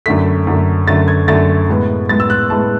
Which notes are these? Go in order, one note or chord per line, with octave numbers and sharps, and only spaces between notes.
F#2 D3 A3 B6
F#2 D3 A3
F#2 D3 A3 A6
G#6
F#2 D3 A3 A6
A2 G#3 B3
A2 G#3 B3 A6
E6
F#6
A2 G#3 B3 A5